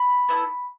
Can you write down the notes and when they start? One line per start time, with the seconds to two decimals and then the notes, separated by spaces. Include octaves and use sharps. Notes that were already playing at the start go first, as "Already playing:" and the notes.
Already playing: B5
0.29 B3 E4 A4